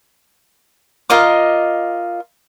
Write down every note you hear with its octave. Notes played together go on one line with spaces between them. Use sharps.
F4 A#4 D#5 D6